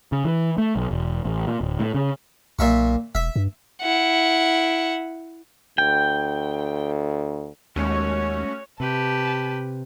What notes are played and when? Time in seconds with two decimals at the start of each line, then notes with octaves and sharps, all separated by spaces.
0.12 C#3
0.25 E3
0.58 A3
0.76 B1
0.91 E1
1.26 A1
1.47 A#2
1.61 D1
1.80 A2
1.95 C#3
2.59 B1 A#2 E5 C#6
3.15 E1 E5
3.36 G2
3.82 E4 F#5
5.78 D2 G5
7.76 D#2 G#3 A3 C#4 F#4 C#5
8.80 C3 G4 B4 A5